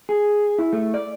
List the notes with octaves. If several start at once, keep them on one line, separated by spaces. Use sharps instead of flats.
G#4
E4
A3
D5